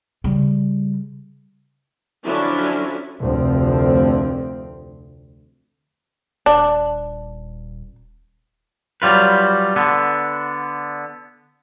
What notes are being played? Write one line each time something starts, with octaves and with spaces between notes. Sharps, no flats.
C#3 G3
D3 F3 F#3 C#4 D4 E4
F1 D2 F3 C4
D#1 D4
F#3 G3 F4 B4
D3 B3